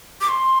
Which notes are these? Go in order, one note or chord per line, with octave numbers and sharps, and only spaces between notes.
D6
C6